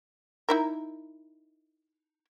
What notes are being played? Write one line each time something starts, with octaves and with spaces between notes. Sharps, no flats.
D#4 E4 A#4